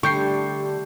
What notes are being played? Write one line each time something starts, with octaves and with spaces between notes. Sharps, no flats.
D3 G3 A3 D4 G4 C#6 G6 C7